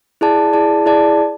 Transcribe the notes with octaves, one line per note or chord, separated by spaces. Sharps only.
E4 G#4 D5 A5
E4 G#4 D5 A5
E4 G#4 D5 A5